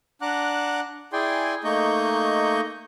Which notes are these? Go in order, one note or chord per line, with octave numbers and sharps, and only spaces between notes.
D4 F#5 A#5 D6 F#6
E4 G#4 D5 G5 G#5 C6
A3 A#3 D#4 D#5 C#6 G6